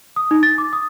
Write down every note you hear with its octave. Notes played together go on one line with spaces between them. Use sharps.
D#6
D#4
A6
D6
D#6